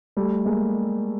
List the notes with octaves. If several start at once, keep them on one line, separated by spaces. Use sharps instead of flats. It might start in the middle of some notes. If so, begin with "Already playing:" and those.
G3 A3
G#3 A#3